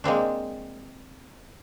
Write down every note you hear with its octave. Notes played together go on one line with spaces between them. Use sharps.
G#3 A#3 C4 D4